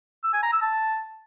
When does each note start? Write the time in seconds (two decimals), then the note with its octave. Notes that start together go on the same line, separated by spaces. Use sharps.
0.23 E6
0.33 G#5
0.43 A#5
0.52 E6
0.62 A5